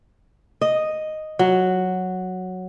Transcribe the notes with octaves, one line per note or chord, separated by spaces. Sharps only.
D#5
F#3